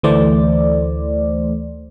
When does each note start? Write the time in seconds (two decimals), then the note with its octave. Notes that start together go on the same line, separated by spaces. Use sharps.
0.03 D2 E3 A3 C5 D5